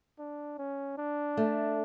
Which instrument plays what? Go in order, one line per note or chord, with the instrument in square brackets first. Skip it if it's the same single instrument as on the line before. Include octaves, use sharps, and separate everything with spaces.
[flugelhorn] D4
C#4
D4
[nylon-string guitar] A3